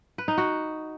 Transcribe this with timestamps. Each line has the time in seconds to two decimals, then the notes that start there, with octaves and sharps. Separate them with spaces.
0.18 B4
0.28 D#4
0.38 F#4